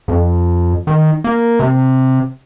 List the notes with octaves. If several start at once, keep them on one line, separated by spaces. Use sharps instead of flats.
F2
D#3
A#3
C3